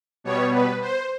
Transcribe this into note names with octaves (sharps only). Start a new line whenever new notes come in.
B2 G3 B3 C#5
B4
C5